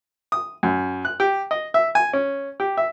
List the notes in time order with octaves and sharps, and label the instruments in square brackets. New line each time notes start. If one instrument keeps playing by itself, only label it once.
[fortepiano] D#6
F#2
F#6
G4
D#5
E5
G#5
C#4
G4
E5